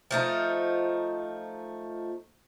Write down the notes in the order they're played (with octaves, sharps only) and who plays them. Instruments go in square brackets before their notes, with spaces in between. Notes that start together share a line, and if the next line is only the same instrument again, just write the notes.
[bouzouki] F3 A3 D#4